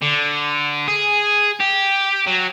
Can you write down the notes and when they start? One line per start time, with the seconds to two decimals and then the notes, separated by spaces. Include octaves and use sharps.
0.02 D3
0.88 G#4
1.60 G4
2.27 F#3